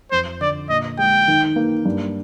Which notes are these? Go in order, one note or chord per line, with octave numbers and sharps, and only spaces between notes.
F2 C5
D3 D5
A#2 D#5
G#3 G5
D#3
A#3
G2